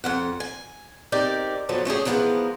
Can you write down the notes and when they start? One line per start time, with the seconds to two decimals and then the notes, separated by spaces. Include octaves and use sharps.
0.04 F2 F3 F#5
0.40 G#5
1.12 C4 D#4 G4 A#4 D5
1.69 D3 F3 F#3 B3
1.85 A3 C#4 G4 G#4
2.05 G#2 E3 F3 B3 G#4 A#4